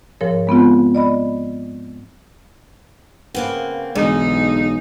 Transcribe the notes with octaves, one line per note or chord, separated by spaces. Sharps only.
G#2 F3 A#4 C#5
G#3 B3 C4 F4
D5 D#5 B5
C#3 A#3 C4 B4 F#5
B1 D3 E3 G#3 D#4 G#4